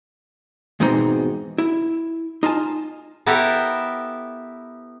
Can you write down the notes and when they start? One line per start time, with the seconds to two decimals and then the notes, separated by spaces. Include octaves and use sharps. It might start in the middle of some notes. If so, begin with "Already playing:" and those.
0.80 E2 G#2 B2 G#3 C4 D#4
1.58 E4
2.43 D#4 F4 G#5 A5
3.26 B3 E4 G4 A4 A#4 E5